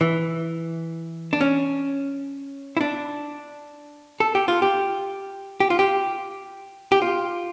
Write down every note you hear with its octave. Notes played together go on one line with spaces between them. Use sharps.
E3
D4
C#4
E4
D4
A4
G4
F4
G4
G4
F4
G4
G4
F4